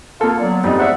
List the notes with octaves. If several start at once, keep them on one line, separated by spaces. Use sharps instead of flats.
A#3 F4 A4
D3 F#3 B3 D5
F2 G3 D#4 D5
G#3 A3 C5 E5 F#5